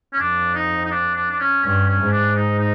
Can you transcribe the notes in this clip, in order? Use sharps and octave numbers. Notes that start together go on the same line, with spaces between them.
C#4
F2 D4
D#4
D#4
D4
D4
D4
C#4
G2 C#4
C#4
G#2
D4
D#4
D#4